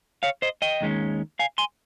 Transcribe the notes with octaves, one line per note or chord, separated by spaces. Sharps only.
C#5 F5
C5 D#5
D#5 G5
D#2 D#3 G#3 C#4
F5 G#5
G#5 C6